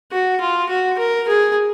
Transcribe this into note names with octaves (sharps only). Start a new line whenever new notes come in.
F#4
F4
F#4
A#4
G#4